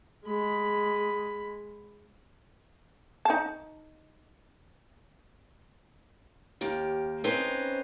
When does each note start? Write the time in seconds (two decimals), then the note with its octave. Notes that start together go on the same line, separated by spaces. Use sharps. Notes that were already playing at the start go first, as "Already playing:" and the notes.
0.25 G#3 B5
3.25 D#4 A5
6.61 D#2 A#3 G4
7.24 C4 C#4 D#4 B4 C5